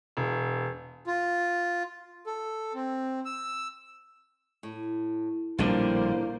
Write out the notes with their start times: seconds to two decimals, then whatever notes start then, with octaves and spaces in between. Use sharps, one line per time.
0.17 E1
1.07 F4
2.27 A4
2.74 C4
3.25 E6
4.63 A2
5.59 A#1 A2 D3 G3 A#3 D4 F4 C5